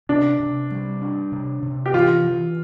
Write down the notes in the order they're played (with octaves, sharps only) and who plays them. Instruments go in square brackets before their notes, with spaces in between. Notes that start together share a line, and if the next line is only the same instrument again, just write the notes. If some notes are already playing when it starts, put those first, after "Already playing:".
[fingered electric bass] C3 [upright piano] D4
[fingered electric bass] C3
G3
D4
C3
C3
[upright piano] G4
[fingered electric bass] E3 [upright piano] F4
[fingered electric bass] E3